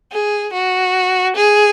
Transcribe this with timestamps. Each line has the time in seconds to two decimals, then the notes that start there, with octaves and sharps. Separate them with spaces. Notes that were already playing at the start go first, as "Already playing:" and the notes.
0.12 G#4
0.53 F#4
1.37 G#4